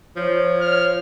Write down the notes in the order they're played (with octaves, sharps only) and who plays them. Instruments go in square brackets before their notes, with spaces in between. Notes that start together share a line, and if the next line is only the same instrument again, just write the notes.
[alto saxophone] F3 [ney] C#5
[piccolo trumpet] F6